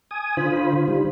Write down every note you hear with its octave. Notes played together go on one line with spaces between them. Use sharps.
G#5 D#6
D3 F4 C5 B5
D#3 G3